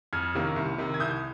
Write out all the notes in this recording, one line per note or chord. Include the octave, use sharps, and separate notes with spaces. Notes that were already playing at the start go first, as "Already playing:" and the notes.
F2 F6 G#6
C3 D#3 A#3 C#4
C2
C3 D#3
G#6
C2 D#6 G6